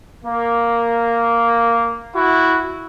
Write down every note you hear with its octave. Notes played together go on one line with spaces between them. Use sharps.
A#3
E4 F#4